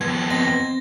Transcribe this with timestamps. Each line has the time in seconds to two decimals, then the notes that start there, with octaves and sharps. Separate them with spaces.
0.01 F2 B3 G#6
0.30 C4 D#5 A#6